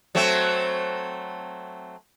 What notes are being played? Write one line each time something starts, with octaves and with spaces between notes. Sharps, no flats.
F#3 A3 C4